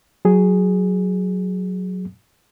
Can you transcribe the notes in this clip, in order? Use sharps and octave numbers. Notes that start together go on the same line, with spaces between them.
F#3 G#4